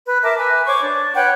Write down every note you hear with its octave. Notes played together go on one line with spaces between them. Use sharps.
B4
A#4 E5 A5 D6
B4 G#5
C5 C#5 C#6 D6
D4
B4 C#5 F#5 G5